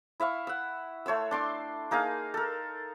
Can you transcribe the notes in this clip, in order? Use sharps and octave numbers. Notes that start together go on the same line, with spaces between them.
E4 E5 F5 C#6
F#5 E6
A3 C#5 C6 E6
D4 C6 D6
A#3 D#4 G#4 F5
A4 A#4